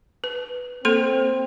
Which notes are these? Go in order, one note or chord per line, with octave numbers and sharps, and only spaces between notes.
B4
A#3 C4 A4 C6